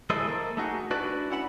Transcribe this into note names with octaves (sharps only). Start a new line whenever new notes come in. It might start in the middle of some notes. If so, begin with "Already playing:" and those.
E3 G#3 E4 A4 C5 D#5
A#3 A4
A3 D#4 F#4 G#4
D4 E4 F#4 B4 D5
C#4 E4 F#5 B5